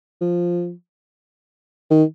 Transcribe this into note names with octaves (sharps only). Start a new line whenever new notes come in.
F3
D#3